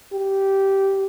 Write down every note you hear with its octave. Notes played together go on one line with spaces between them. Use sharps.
G4